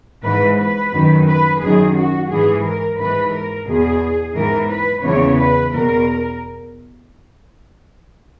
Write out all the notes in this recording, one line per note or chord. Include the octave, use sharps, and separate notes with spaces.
G#2 E3 B4
B4
F#2 D#3
B4
F#2 D#3 G#4
F#4
G#2 E3 G#4
A#4
G#2 E3 B4
A#4
E2 B2 G#4
G#2 E3 A#4
B4
E2 C#3 E3 C#5
B4
E2 B2 A#4